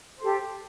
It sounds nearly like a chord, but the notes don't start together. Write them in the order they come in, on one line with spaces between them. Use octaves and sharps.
C5 A4 G4